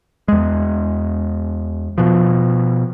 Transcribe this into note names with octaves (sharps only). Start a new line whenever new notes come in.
E2 G#3
B2 F3